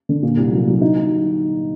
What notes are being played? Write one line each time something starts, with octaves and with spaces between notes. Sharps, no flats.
D3
A#2
C2
F#3
F#3
D#4